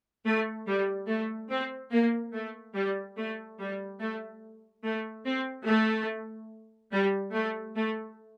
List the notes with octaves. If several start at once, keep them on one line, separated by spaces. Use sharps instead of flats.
A3
G3
A3
C4
A#3
A3
G3
A3
G3
A3
A3
C4
A3
G3
A3
A3